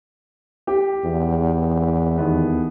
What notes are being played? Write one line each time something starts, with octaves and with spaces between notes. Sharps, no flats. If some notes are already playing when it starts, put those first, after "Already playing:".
G4
E2
D#2 B3